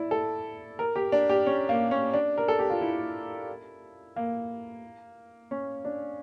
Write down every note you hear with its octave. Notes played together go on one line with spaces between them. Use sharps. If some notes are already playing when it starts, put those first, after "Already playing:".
Already playing: E4 D5 E5
A4
A#4
G4
D4
G4
C#4
A#3
C#4
D4
A#4
A4
G4
F4
E4
A#3
C#4
D4